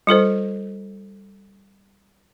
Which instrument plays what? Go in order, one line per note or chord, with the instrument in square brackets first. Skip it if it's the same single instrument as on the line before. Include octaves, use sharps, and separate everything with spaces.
[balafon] G3 F4 A4 C5